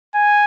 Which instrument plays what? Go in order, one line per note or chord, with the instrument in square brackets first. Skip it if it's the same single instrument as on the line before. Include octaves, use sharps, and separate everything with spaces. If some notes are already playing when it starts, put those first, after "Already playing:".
[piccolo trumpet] G#5